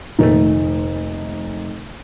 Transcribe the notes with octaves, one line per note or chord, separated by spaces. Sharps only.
F1 A#2 D#3 A3 D#4